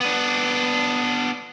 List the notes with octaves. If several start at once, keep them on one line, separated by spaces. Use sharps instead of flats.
B3 D4